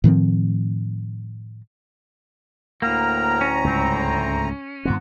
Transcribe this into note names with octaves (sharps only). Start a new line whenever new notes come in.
A2 D#3 F3 C4
D2 A2 A#3 F#5 G5 A#5 F6
C#4
C#2 G#2 G3 A3 C4
G2 D#3 B3 C4 F4 F#4